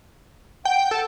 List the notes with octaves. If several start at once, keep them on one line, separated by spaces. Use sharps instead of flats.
F#5 G5
A4